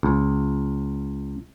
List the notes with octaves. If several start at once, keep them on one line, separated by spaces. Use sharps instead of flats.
C#2